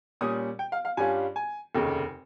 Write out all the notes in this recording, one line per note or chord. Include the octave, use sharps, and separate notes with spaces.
A#2 G3 C#4 D#6
G5
F5
F5
G2 G3 C#4 F4 G#5
G#5
F1 D#2 C#3